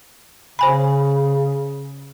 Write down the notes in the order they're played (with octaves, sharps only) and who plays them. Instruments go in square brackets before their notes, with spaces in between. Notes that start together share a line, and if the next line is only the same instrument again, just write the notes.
[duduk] C#3 [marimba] C5 G#5 B5